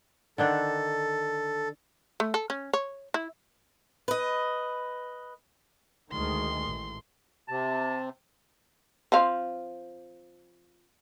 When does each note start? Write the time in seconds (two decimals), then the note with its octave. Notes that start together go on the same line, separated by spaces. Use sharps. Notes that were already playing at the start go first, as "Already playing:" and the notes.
0.38 D3 D#3 D4 A4
2.20 A3
2.34 A4
2.50 C#4
2.73 C#5
3.14 E4
4.08 B4 D#5
6.12 D2 D#3 G#3 C6
6.66 A1
7.48 C3 A5
9.12 F3 C4 F5